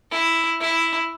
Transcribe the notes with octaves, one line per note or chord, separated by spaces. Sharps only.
E4
E4